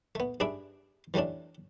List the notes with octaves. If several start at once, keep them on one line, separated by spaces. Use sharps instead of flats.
A3 B3
G2 D4 G#4 E5 B5 D6
E3 G3 A3 C#4 D4